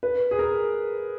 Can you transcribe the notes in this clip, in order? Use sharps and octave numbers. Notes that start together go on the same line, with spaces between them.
B4
G#4
A#4